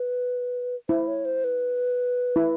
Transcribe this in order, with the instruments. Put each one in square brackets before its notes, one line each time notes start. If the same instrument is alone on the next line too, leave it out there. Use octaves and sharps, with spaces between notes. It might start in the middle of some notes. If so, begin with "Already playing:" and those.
Already playing: [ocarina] B4
[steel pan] E4 [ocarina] C5
[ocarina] C#5
C5
B4
[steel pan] E4